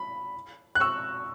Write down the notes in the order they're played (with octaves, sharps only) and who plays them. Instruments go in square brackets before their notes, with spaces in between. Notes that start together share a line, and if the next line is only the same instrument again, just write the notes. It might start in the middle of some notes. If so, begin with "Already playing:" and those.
Already playing: [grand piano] B5
F#6
C#6 E6